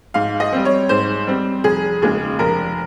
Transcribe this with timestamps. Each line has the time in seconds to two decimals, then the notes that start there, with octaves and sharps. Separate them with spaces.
0.14 G#2 F5
0.40 D#5
0.52 G3 C4
0.65 C#5
0.89 G#2 C5
1.27 G3 C4
1.64 F1 G#4
2.02 D#2 C#3 G#3 G#4
2.39 F1 A#4